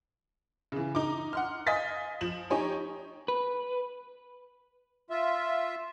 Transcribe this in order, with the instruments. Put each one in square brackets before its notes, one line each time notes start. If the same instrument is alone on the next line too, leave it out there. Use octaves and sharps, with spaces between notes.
[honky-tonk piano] C#3 E3
D#4 D6
F#5 C6 F6
D#5 F5 G#5 A6 B6
F3 E7 F#7
D#4 G4 C#5 G#5
[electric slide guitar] B4
[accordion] F4 E5